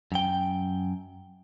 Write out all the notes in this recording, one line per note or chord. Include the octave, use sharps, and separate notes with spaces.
F#2 G5